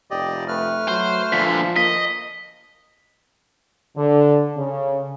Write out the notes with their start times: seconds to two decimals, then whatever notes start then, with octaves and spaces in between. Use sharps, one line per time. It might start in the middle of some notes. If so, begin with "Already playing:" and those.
0.11 F1 G4 D5 D#5
0.48 A3 B4 F6
0.88 F#3 C5
1.32 A#2 D3 F3 B6
1.76 A#3 D#5 B6
3.95 D3
4.56 C#3